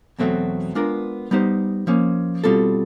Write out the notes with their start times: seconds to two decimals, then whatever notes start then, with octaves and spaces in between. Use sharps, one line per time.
0.19 E2 B2 F#3 A3 C4
0.75 G#3 B3 D4 F4 A#4
1.31 G3 B3 D#4 G4 C5
1.87 F3 A#3 C#4
2.44 B2 G3 C4 F4 A4